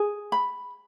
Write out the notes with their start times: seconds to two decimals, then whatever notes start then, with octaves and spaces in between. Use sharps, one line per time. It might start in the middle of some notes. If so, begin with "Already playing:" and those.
Already playing: G#4
0.32 B5